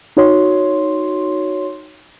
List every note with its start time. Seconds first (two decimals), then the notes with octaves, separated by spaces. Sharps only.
0.17 D#4 F#4 C#5 C6